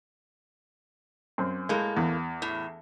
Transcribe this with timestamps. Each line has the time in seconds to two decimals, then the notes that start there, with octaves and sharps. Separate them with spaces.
1.38 F#2 C4
1.69 A2 G#3 A#3
1.97 E2
2.42 A2